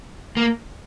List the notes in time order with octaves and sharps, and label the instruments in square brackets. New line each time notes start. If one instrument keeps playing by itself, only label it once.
[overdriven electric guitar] A#3